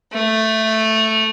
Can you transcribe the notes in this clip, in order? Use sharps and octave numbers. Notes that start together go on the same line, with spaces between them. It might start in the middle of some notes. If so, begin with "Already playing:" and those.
A3